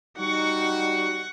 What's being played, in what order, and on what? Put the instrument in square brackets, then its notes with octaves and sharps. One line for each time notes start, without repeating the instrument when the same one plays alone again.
[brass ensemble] G3 D#4 F#4 [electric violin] F#5 C#6